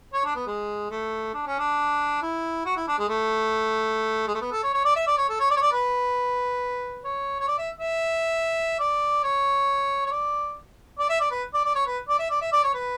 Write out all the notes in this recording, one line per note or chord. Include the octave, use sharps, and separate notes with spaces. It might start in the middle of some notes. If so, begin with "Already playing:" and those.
C#5
D4
B3
G#3
A3
D4
C#4
D4
E4
F#4
E4
D4
G#3
A3
G#3
A3
B3
A4
C#5
C#5
D5
E5
D5
C#5
A4
C#5
D5
C#5
D5
B4
C#5
C#5
D5
E5
E5
D5
C#5
C#5
D5
D5
E5
D5
B4
D5
D5
C#5
B4
D5
E5
D5
E5
D5
C#5
B4